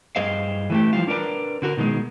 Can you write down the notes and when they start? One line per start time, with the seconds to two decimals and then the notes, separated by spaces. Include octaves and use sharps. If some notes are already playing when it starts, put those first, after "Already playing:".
0.16 G2 G#4 C5 D#5 F5
0.70 E3 A3 G4
0.93 E3 F3 G3 F4
1.07 D4 A#4 B4 D5 A#5
1.62 D3 F#4 A#4
1.77 B2 D#3 F#3 G#3